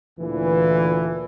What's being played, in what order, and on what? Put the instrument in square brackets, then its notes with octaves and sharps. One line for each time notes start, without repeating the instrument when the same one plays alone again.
[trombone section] D2 A#2 E3